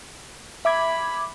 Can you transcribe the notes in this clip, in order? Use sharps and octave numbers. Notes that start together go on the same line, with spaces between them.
E5 B5 D6 G#6